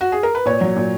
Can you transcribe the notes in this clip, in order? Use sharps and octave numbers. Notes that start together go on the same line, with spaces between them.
F#4
G#4
A#4
B4
A#2 C#5
F#3
A#2